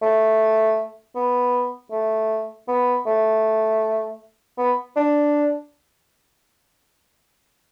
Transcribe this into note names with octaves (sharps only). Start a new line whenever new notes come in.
A3
B3
A3
B3
A3
B3
D4